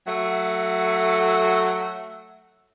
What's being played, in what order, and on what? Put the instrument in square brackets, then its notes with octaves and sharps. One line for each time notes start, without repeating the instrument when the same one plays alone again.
[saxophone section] F#3 A3 E5 F#5